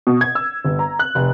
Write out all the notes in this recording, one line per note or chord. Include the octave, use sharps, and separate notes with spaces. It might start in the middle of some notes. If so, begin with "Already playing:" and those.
B2
G#6
E6
G1
A#5
F#6
F1